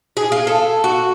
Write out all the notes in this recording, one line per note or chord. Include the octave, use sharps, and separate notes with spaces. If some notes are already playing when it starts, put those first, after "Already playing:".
G#4
F4
A4
F#4